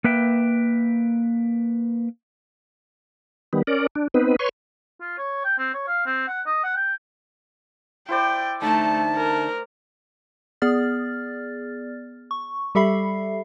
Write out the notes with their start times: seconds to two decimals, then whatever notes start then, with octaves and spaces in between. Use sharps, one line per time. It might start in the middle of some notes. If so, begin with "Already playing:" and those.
0.04 A#3 B4 E5 G5
3.53 D#3 G3 B3
3.67 C#4 A#4 D5
3.95 D4
4.14 B3 C4 D#4 B4
4.39 B4 C#5 C6 C#6
5.01 F4
5.18 C#5
5.45 G5
5.58 C4
5.74 C#5
5.87 F5
6.06 C4
6.28 F#5
6.46 D#5
6.64 F#5
6.76 G5
8.09 E4 C5 D5 G5
8.62 D3 A3 D#4 E5 A5
9.16 A#4
10.62 B3 G#4 D5 F6 A6
12.31 C#6
12.75 G3 G4 A4 E5 B5 C7